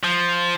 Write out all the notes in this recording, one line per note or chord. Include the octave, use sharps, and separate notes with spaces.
F3